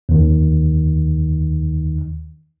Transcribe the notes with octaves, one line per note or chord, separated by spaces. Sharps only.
D#2 D#3